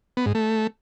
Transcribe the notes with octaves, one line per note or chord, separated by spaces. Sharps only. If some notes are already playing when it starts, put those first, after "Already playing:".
B3
G#2
A3